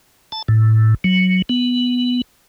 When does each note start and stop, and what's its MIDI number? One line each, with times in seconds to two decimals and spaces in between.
0.32 0.42 81
0.48 0.95 45
1.04 1.42 54
1.49 2.22 59